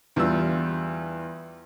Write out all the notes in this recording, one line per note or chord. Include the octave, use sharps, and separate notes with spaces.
E2 G3 F4 E6